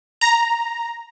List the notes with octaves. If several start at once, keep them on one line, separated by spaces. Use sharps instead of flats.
A#5